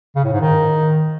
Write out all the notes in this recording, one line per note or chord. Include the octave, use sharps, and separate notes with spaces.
C#3
A2
G#2
D#3